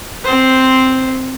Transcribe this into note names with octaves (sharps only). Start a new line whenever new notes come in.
C4 C5